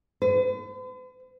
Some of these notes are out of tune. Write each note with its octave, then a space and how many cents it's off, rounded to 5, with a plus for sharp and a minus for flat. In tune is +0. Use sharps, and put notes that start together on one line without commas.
B4 +45